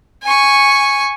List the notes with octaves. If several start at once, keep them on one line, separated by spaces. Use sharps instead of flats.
G#5 C#6